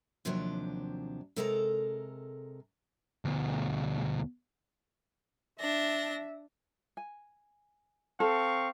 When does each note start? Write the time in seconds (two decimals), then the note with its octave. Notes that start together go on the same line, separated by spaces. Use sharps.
0.25 D#2 C3 F3 F#3 D4
1.36 C3 G#3 A4 A#4 F#5 A#5
3.25 D2 B2
5.60 D4 E5 A#6
6.97 G#5
8.20 C4 A4 F5 C#6